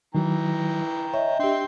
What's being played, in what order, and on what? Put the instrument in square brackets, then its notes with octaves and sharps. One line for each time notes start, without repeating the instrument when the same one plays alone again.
[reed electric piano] D#3 F#3 [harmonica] E3 G5 A#5
[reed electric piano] C#5 [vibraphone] D#5 E5
[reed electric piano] D4 G4 [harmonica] G5 C6